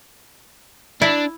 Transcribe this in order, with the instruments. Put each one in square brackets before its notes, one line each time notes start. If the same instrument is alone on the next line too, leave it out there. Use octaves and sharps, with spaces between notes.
[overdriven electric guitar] D4 [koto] E4